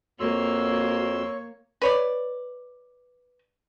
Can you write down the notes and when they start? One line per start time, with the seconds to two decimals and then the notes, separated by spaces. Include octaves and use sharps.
0.20 F2 A#3 F#4 C#5 C6 E6
1.82 B4 C#5 D5